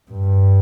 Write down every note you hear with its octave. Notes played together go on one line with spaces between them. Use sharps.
G2